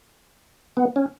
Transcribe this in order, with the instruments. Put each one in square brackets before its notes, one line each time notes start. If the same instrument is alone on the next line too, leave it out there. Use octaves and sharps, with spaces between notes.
[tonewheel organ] B3
C#4